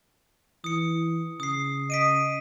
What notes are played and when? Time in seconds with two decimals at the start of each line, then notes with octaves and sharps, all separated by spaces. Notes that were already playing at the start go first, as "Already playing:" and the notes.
0.64 E3 D#6 C#7
1.40 C#3 D#6 C7
1.90 D#5 B6 D7 D#7